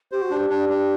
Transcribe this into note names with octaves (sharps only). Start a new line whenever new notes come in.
G4 C5
F#4
D4 G4
D4
D4